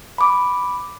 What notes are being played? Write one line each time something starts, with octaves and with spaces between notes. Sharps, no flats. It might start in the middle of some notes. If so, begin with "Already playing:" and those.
B5 D6